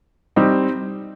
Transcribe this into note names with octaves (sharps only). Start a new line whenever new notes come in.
G3 C4 D#4